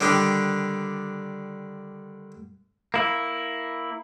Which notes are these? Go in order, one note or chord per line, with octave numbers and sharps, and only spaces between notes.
D3 D#3 G3 D4
A#3 E4